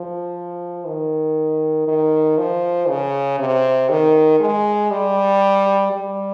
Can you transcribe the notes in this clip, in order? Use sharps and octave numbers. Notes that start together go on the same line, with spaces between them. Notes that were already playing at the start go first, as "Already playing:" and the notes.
Already playing: F3
D#3
D#3
F3
C#3
C3
D#3
G#3
G3
G3